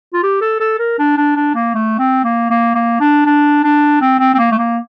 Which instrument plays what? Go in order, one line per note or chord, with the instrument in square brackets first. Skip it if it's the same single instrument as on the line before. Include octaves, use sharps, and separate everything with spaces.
[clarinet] F4
G4
A4
A4
A#4
D4
D4
D4
A#3
A3
C4
A#3
A#3
A#3
D4
D4
D4
C4
C4
C4
A#3
A3
A#3